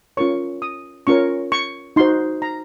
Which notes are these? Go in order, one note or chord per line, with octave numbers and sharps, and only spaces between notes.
C#4 F4 A#4 C#5 C#6
D#6
C#4 F4 A#4 C#5 C#6
C#6
D#4 F#4 C5 C6
A#5